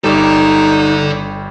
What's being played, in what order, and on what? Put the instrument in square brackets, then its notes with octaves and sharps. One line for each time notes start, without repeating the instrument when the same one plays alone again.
[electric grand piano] G1 G3 [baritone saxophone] D#4 [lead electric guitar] A4 D5